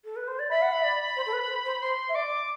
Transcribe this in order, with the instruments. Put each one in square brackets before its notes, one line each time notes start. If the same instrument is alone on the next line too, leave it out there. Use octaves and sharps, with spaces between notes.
[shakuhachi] A4
B4
C5
D5
[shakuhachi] E5 [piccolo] B5
[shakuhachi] F#5
E5
D5
C5
A4
B4
C5
C5
[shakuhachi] C5 [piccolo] C6
[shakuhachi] E5
[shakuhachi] D5 [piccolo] D6